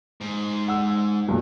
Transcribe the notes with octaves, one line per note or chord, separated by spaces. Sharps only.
G#2
F#5 E6
B1 G2 A#2